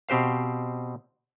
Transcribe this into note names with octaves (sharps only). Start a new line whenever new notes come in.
B2 C4 G4 C5 F5